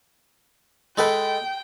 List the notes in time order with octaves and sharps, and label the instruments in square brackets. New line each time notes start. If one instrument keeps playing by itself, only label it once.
[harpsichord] G#3 A4 B4 [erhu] G5